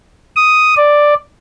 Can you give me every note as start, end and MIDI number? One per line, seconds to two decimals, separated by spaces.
0.36 0.74 87
0.77 1.14 74